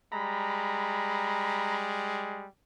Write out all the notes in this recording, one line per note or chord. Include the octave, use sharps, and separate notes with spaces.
G3 G#3 A#5 B5